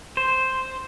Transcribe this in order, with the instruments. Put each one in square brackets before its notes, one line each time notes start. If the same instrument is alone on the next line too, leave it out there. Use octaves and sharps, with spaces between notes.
[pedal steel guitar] C5